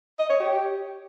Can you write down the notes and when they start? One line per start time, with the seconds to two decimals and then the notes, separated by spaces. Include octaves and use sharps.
0.19 D#5
0.29 C#5
0.40 G4